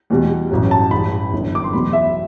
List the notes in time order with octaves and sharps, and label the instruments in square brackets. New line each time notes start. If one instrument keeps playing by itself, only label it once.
[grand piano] E2 B2 G3
A1 G2 F#3
A5
A1 G2 E3 G3 B5
G1 F#2 E3
D6
C6
E2 B2 F#3 B5
E5